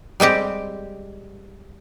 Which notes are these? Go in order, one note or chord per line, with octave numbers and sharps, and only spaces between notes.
G3 G#3 C4 G4